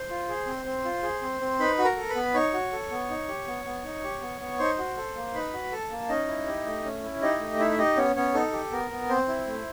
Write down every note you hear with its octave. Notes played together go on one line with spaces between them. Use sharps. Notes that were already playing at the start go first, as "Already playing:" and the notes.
Already playing: C5 C6
F4
G#4
C4
C4
F4
G#4
C4
C4
D#4 B4 B5
F#4
A#4 A#5
A4
B4 B5
B3
D#4 C#5 C#6
F#4
A4
B3
D#4
G4
B3
B3
D#4
G4
B3
B3
D#4 C5 C6
F#4
A4
A#3
D#4 B4 B5
F#4
A4 A5
A#3
C#4 D#4 D#5
E4
G4
A3
C#4
E4
D#4 G4 D#5
A3
D#4 E4 E5
E5
D#4 G4 D#5
B3 C#4 C#5
B3 C#4 C#5
D#4 A4
G4
B3 A#4
B3
C4 C5
E4
A3